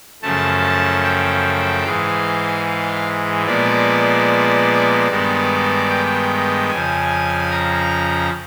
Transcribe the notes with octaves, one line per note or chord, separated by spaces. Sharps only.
F#2 C#3 F3 A3 A5
G5
G#2 E3 G#3 F5
F5
A#2 F3 G#3 B3 D5
G2 D#3 G#3 B3
G5
F2 C#3 F3 G#5
A#5